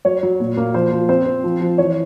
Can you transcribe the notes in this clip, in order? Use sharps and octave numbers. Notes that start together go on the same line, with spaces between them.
F#3 C#5
F#3
A#2
A#3
F3 C5
F3
C4 C5
C4
F3
F3
E3 C#5